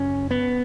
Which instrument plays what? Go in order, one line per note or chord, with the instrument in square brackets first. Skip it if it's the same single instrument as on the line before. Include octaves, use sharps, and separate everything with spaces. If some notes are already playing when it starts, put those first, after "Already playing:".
Already playing: [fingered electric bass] F#2 C#3 C#4
B3